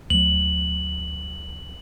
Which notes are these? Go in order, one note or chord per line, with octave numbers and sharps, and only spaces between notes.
D2 F#3 F#7